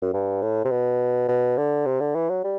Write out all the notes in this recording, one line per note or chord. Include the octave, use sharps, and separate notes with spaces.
F#2
G2
A2
C3
B2
B2
D3
C3
D3
E3
F#3
G3